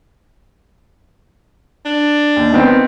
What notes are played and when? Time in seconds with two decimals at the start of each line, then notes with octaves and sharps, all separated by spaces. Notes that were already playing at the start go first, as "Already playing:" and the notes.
1.85 D4
2.36 D#2
2.52 D#3 B3 C4